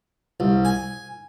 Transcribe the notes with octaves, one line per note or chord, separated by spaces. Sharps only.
C2
G#5